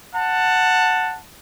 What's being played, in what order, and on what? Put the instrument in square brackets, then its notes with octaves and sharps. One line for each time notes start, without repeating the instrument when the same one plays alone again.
[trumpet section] F#5 A5